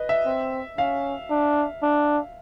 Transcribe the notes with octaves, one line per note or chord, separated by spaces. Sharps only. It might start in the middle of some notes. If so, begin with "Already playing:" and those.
Already playing: B4 D#5
E5
C4
C#4 F5
D4
D4